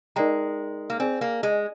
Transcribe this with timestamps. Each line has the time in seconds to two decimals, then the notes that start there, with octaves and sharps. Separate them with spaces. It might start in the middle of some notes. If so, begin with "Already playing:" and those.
0.16 G#3 D#4 A#4 D5 G5 A#5
0.90 A#3
1.00 C4 G#4 D5 G#5
1.21 A#3
1.43 G#3